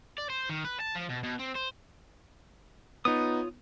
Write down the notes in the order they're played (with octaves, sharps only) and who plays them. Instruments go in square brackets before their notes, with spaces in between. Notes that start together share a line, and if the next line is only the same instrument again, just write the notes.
[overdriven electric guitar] D5
C5
D#3
B4
A5
F3
B2
B2
C4
C5
[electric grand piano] B3 D#4 [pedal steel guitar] F4 C#5 D#6